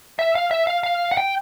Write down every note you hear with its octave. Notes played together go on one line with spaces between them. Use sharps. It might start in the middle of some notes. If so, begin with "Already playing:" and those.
E5
F5
E5
F5
F5
F#5
G5